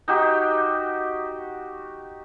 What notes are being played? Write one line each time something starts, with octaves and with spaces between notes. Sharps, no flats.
D#4 F#4 G4